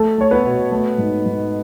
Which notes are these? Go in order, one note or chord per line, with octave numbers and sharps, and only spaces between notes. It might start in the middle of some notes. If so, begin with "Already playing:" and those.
Already playing: A3 A4
A3 C#5
B3 B4
B2
A3
G#2
G#2